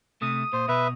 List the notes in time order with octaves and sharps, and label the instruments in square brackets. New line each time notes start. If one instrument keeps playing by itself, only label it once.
[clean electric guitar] C3 A3 [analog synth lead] D#6
[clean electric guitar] A#2 [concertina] C5
[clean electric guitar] B2 [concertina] B4 E5